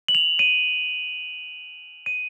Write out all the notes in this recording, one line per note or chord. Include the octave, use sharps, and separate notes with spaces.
F#7
F7
D#7
D#7